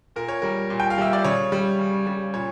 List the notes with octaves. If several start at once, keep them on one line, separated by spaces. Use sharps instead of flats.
A#2 A#4
C#5
G3 A#4
A#2
G5
F5
G3 E5
D5
C#3 C#5
G3
C#3
G3
A#2 C#5